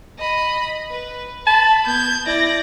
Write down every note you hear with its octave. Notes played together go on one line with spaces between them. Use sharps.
D#5 B5
B4
A5 B5
B3 G6 G#6
E4 D5 A#6